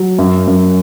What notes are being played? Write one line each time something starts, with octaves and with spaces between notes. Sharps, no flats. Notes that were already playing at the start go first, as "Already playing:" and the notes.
Already playing: F#3
F#2
F#2